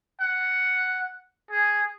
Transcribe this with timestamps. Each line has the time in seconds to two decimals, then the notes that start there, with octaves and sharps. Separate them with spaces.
0.21 F#5
1.51 G#4